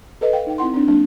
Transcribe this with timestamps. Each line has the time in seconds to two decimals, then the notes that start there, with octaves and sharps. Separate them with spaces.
0.21 A4 B4 D#5
0.33 F5 G5
0.47 D#4 G5
0.58 C4 E4 F#5 C6
0.74 C4 D4
0.88 F#3 A#3 D4